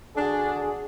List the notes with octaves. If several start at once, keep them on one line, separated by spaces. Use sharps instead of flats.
D3 D4 F#4 G#4